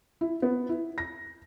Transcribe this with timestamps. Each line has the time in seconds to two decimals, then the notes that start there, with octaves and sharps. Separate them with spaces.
0.21 E4
0.42 B3
0.69 E4
0.98 A#6